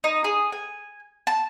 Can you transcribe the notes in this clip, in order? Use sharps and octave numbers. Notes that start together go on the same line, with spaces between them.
D#4
G#4
G#5
A5